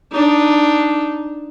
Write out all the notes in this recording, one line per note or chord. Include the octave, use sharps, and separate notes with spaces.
D4 D#4